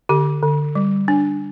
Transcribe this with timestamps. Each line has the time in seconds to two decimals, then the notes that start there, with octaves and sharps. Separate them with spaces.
0.09 D3 G4
0.43 D3
0.75 G3
1.08 D4